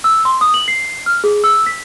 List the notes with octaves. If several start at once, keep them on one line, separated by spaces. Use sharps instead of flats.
E6
C6
D#6
F#7
C7
F6
G#4
E6
B6